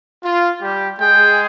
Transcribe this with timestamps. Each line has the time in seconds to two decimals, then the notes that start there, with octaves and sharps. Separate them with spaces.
0.24 F4
0.62 G3 G4
1.01 G#3 G#4 G5